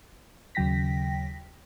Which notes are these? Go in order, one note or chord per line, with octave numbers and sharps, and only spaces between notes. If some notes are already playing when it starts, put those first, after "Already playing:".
D#2 C#3 F#3 G5 A#6 B6